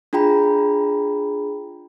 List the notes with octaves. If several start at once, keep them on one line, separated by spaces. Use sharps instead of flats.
D4 F4 G#4 G5 A#5 B5